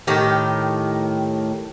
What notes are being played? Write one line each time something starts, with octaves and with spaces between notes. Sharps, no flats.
A2 D#3 G4